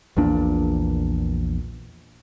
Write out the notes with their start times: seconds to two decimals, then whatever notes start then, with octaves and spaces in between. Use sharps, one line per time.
0.17 A#1 E2 A#2 D4